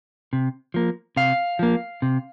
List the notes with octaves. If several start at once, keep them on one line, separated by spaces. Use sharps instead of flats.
C3
F3 A#3
C3 F5
F3 A#3
C3